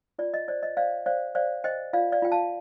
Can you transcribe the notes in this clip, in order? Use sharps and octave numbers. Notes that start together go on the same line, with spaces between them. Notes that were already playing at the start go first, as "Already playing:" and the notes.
F4 D5
D#5
C5 D5
D#5
C5 D5 F5
C5 D5 F5
C5 D5 F5
C5 D#5 G5
F4 D5 F5
D5 F5
F4 G5
F5 A5